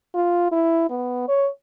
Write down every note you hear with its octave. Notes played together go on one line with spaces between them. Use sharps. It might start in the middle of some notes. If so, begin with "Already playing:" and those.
F4
E4
B3
C#5